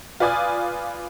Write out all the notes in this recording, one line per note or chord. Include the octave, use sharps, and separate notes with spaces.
F4 B4 D5 G#5 D#6